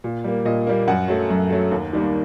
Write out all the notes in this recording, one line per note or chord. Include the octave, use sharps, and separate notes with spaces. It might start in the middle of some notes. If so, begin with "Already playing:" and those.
A#2
G3 A#3
A#2 D#5
G3 A#3
F#2 F#5
F#3 A3
F#2
F#3 A3
D#2
D#3 G3 A#3